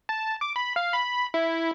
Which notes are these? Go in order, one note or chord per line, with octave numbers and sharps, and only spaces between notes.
A5
D6
B5
F5
B5
E4